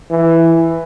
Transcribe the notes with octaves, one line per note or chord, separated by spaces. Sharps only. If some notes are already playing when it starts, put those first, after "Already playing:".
E3